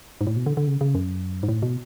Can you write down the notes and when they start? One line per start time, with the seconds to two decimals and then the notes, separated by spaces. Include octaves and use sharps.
0.21 G#2
0.27 A2
0.36 B2
0.46 D3
0.57 D3
0.67 C#3
0.81 C#3
0.95 F#2
1.43 G#2
1.48 A2
1.62 B2